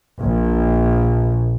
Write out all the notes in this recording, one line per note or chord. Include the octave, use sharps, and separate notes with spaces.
A#1